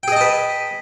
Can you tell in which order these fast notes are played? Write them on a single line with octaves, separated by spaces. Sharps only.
G5 G#4 D#5 A5 B4